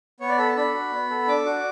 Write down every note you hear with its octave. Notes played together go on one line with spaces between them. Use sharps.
B3 C#5
D5
A4 B5
A5
D4 B5
F#4
B3
A4
D4 D6
F#4